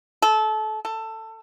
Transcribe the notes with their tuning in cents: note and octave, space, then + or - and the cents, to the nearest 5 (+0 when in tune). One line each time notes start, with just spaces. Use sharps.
A4 -25
A4 +15